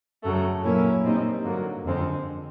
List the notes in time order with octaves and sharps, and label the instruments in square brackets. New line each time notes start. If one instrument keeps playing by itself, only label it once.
[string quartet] F#2 C#3 F#3 A3
A#2 F#3 A#3 C#4 E4
A#2 G3 C4 D#4
G2 D3 F#3 A#3
F2 D3 F3 G#3 C4